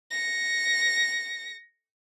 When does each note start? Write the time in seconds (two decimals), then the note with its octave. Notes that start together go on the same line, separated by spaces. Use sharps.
0.11 A#6 C#7